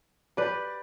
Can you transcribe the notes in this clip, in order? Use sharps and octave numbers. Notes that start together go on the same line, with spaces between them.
G4 B4 D5